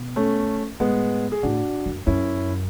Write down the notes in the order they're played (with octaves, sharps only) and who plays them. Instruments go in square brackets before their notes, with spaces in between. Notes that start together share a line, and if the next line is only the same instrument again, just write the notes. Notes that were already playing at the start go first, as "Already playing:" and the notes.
Already playing: [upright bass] B2
[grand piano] A3 C#4
[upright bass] A2 [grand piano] G#3 B3
[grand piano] G#4
[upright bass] A2 [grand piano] D4 F#4
[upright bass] F#2
[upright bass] F#2 [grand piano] C#4 E4